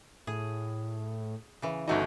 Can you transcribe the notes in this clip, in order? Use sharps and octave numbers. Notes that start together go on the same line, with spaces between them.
A2 G#4
C#3 E3
G1 E3 A3 D#4 F#4 D#5